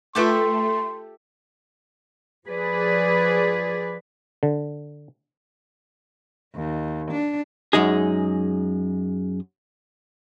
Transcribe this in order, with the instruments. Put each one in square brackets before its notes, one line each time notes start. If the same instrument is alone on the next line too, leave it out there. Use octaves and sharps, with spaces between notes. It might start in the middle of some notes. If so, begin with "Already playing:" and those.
[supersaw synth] A3 [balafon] F4 B4 D6 [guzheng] G4 A4 E5 [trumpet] C6
[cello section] F3 G#4 B4 D5
[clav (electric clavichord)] D3
[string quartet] D#2
D4
[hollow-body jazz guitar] F#2 G#3 D#4 G#4